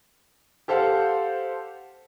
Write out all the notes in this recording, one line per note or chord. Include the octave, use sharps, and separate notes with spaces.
G4 A4 C5 F5 F#5